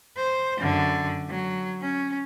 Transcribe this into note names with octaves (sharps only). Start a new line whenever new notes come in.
C5
F#2 D3
F#3
C#4